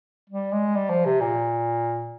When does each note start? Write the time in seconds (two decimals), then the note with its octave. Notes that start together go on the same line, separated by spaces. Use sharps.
0.30 G3
0.52 G#3
0.76 G3
0.90 F3
1.05 C3
1.21 A#2